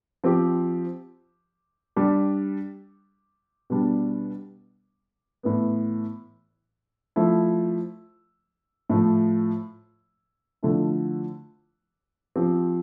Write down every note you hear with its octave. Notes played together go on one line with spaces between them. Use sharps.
F3 C4 G4
G3 D4 G4
B2 G3 D4
A2 E3 B3
F3 A3 E4
A2 F3 A3
D3 F3 A3 E4
F3 C4 G4